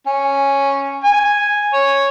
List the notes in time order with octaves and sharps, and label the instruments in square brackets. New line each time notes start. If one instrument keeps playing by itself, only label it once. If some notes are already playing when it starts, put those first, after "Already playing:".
[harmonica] C#4
G#5
C#5